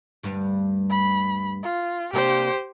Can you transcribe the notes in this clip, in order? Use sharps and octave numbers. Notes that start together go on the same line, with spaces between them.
D2 G2
B5
F4
C3 A#3 D4 G4 C5